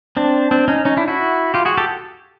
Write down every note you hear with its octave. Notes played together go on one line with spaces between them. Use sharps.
C4 D4
C4 D4
C#4 D#4
C#4 D#4
D4 E4
E4 F#4
F4 G4
F#4 G#4
G4 A4